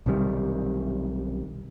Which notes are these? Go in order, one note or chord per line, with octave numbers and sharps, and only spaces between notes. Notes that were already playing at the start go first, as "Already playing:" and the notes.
B1 C3 D#3 G3